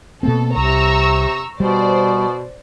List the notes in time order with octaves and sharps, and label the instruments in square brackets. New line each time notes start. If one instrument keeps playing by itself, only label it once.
[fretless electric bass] B2 A#3 C4 [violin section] A4
[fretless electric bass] C2 [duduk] C3 [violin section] A#5 C#6 E6
[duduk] B2 [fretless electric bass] G3 [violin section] C5 D5